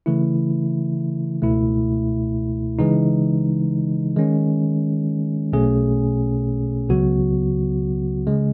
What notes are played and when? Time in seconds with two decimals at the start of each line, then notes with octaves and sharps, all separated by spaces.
0.06 C#3 E3 A3 E4
1.42 C#2 B2 A3 E4
2.79 C#3 E3 G#3 D#4
4.16 D#3 G#3 C#4
5.53 B1 B2 A3 C#4 G#4
6.89 C#2 C#3 F#3 B3 F#4
8.27 C#3 G#3